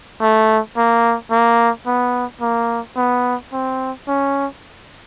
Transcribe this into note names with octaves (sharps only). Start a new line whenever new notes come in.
A3
A#3
A#3
B3
A#3
B3
C4
C#4